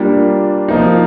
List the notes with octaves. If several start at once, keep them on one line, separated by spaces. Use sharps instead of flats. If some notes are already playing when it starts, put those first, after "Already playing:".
Already playing: G3 A#3 D4 F4
F3 A#3 D#4